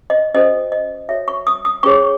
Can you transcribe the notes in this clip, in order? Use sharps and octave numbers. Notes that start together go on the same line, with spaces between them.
D#5
C#4 F#4 A4 C5 D#5
D#5
F#4 A4 C#5 E5
C#6
D#6
D#6
C#4 G#4 C#5 C#6